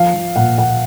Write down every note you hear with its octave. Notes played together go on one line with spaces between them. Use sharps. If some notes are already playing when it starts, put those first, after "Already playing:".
Already playing: F3 F5
F3
A#2 F#5
A#2 F#5